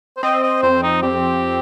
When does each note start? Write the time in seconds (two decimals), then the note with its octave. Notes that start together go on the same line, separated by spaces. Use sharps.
0.17 C5
0.23 C4 D#5
0.43 D#5
0.63 F2 C5
0.83 D#4
1.03 F2 G4